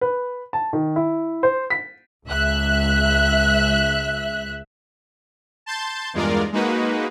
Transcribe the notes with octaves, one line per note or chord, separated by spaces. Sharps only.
B4
A5
D#3
E4
C5
B6
C#2 E5 F#6
A5 C6 G6 A6
E2 G2 G#3 F4 A#4 D5
G#3 A#3 D#4 F#4 B4